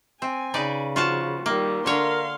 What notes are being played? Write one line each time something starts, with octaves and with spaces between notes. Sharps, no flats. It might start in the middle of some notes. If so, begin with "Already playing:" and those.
C4 G#5
C#3 D#4 B4 D5
F3 F4 F#4 A5
D#3 G3 A#3
D3 A#4 C#5 F5 C6